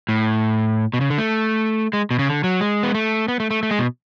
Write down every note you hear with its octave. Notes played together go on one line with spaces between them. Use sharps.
A2
B2
C#3
D3
A3
G#3
B2
C#3
D3
F#3
G#3
B3
A3
B3
A3
A3
A3
G#3
B2